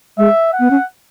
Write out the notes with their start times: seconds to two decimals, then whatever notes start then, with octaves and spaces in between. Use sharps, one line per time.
0.18 G#3 E5
0.53 F#5
0.60 B3
0.70 C#4